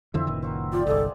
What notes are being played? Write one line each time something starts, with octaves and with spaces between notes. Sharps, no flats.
F2 D3 E3 C4 E4
F#1 A#2 D#3 B4
C4 F#4 A#4
G3 F4 D5 G5
G1 C2 G#3 A4 G#5 D6